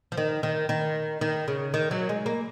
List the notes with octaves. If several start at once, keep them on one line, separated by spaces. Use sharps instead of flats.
F3
D#3
D#3
D#3
D#3
C#3
D#3
F#3
G#3
A#3